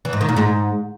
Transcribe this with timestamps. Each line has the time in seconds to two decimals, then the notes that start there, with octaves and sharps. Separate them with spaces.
0.05 E3
0.13 G#2
0.21 D#3
0.29 A#2
0.36 G#2